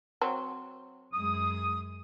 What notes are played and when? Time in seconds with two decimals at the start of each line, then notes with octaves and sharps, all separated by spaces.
0.21 F#3 C4
1.14 F#2 G#3 D#6